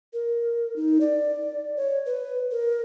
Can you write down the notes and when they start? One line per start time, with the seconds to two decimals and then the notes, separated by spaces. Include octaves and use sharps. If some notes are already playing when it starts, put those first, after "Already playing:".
0.13 A#4
0.76 D#4
1.01 D5
1.76 C#5
2.06 B4
2.51 A#4